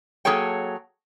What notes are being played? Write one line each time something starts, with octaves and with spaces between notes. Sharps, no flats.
F#3 A#3 G#4 A4 C#5 G5